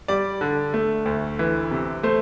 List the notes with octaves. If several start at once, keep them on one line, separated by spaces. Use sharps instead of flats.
G3 D5
D3
A3
D2
E3
C3
A3 C5